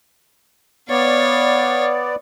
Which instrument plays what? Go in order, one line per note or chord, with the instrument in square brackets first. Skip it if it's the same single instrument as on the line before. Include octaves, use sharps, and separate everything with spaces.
[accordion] B3 D5 [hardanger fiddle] C#5 F5